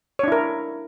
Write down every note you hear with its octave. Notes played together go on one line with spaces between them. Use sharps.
D4 E4 A#4 C#5